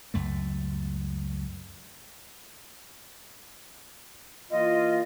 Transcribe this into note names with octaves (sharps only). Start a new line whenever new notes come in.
C#2 F#2 A3
E3 A#3 F4 D#5